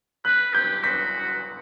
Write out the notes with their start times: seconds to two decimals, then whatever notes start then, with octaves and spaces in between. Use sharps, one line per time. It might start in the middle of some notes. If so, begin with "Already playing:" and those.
0.25 B4 F#6
0.54 G4 G6
0.83 F#4 B6